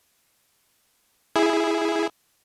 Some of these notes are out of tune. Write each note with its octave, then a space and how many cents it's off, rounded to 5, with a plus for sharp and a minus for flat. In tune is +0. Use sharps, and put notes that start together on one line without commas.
E4 +0 G#4 +0